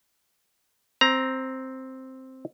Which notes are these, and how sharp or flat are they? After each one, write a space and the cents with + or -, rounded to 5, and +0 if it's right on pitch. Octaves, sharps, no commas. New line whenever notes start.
C4 +0 A#5 +10